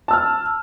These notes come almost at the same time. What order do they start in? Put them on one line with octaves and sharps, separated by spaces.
A5 E6 F6